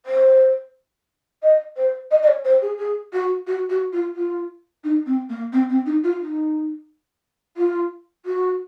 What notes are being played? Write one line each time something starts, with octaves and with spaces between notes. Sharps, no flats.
C5
D#5
C5
D#5
D#5
C#5
C5
G#4
G#4
F#4
F#4
F#4
F4
F4
D#4
C4
A#3
C4
C4
D#4
F4
D#4
F4
F#4